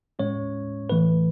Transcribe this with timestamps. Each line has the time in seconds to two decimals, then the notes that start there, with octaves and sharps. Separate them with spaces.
0.19 A2 G#3 C#4 C#5
0.90 A2 E3 A3 B4